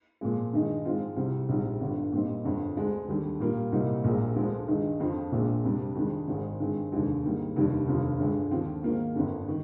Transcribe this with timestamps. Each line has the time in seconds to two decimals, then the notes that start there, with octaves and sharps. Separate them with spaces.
0.21 A#2 F3 G#3
0.53 G2 D#3 G#3 D#4
0.85 G#2 F3 G#3 C4 F4
1.16 C2 C3 G3 C4
1.49 A#1 G#2 G3
1.81 G1 G2 D3
2.12 A#2 G3 C4 D#4
2.44 G1 F2 D3
2.76 D2 D3 G#3 D4
3.08 D#2 D3 G3
3.40 A#2 G3 A#3 F4
3.72 C2 A#2 G3 C4 D#4
4.04 A#1 A#2 G#3
4.36 D2 D3 F3 G#3 D4
4.68 G2 D#3 G#3 D#4
5.00 F2 D3 F3 C4
5.32 A#1 A#2 G#3 D4
5.63 F2 C3 G3 D4
5.95 F2 D#3 G#3 D4
6.28 G#1 G#2 D#3 G#3
6.60 G2 D#3 G#3 C4
6.91 F1 D#2 D3 G#3 D4
7.24 G#2 D#3 G3 A#3
7.56 F1 D#2 D#3 G3 D4
7.88 F1 D#2 D3 F3
8.19 G1 G2 D3 G#3
8.51 D#2 D3 F3 C4 F4
8.83 G#2 D#3 A#3 F4
9.15 G1 F2 D3
9.48 D#3